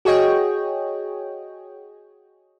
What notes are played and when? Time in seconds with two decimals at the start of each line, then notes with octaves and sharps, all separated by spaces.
0.05 F#4 G#4 C#5 D#5 G5